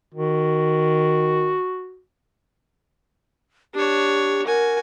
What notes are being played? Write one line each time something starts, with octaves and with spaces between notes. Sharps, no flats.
D#3 F#4
D4 G4 C#5
F#4 A#4 G#5